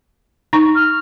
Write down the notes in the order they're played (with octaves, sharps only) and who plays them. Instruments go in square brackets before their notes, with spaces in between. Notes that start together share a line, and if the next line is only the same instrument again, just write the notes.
[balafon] D#4 A#5 C#6
[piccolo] F6